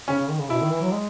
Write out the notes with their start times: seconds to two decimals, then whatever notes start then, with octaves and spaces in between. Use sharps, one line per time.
0.08 C#3 C#4
0.18 C#3
0.29 D#3
0.40 C#3
0.50 B2 E4
0.61 D#3
0.71 E3
0.82 F#3
0.92 G#3